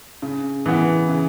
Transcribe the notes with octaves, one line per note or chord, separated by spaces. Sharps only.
C#3
E3 B3
C#3